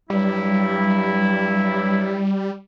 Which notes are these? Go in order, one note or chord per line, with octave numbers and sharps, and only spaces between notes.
G2 F#3 G3 E4